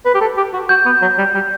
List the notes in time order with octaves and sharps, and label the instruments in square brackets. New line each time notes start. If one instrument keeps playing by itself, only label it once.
[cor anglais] B4
G4
A4
G4
F#4
[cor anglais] F#4 [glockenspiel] G6
[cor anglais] B3
F#3
G3
G3